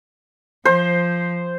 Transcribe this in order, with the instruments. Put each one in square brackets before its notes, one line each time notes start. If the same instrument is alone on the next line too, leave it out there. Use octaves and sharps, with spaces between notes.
[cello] F3 [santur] C5